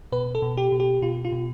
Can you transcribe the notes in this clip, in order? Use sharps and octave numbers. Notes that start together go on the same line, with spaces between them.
B2 B4
A4
B2
G4
B2
G4
B2 F4
F4
B2